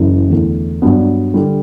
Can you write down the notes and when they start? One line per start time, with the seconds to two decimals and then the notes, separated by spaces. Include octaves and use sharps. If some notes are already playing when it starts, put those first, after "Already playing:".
Already playing: F#1 F#2 E3
0.30 E2 D3 A3
0.82 G2 F#3 B3 D4
1.34 D3 G3